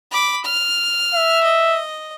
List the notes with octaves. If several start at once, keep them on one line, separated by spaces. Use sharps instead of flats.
B5 D6
F6
E5
D#5